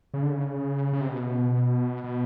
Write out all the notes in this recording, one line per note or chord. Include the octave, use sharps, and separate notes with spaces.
C#3
D3
C#3
C#3
C3
B2
B2